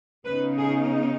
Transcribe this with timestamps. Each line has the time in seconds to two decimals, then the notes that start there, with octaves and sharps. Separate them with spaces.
0.25 C#3 B3 D#4 B4
0.58 G#4